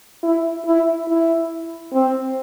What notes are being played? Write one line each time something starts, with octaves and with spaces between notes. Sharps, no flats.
E4
E4
E4
C4